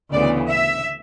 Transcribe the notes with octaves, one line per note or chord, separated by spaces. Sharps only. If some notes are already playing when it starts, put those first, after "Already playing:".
D2 C#3 E3 B3 D5
E5